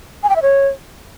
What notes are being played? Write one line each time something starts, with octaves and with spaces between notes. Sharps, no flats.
G#5
G5
E5
C#5